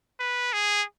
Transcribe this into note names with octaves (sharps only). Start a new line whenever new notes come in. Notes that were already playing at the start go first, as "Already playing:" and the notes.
B4
G#4